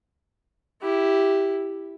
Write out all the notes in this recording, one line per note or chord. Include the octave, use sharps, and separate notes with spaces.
E4 G4